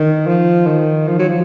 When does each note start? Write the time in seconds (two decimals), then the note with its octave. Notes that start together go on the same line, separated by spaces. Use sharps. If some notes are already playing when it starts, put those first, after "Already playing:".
Already playing: D#3
0.26 F3
0.66 D#3
1.08 F3
1.19 F#3
1.29 F3